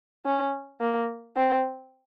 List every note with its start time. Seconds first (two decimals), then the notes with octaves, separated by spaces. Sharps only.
0.26 C#4
0.80 A#3
1.37 C4